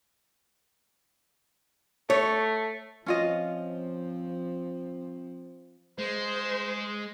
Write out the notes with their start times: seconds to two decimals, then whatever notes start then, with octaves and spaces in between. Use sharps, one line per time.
2.10 A3 C#5
3.06 F3 C4 C#4 F4 D#5
5.99 G#3 C5